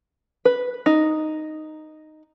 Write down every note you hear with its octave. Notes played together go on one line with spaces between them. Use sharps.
B4
D#4